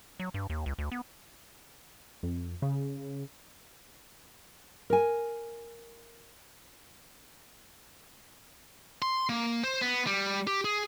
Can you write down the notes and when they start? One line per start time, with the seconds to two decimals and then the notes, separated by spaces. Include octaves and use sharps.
0.20 F#3
0.34 G2
0.50 D#2
0.66 C#2
0.79 D2
0.92 B3
2.23 F2
2.62 C#3
4.90 A#4 G#5
9.02 C6
9.29 A#3
9.63 C5
9.82 B3
10.07 G3
10.47 G4
10.64 G#4